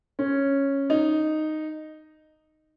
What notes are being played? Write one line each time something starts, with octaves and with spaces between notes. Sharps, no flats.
C#4
D#4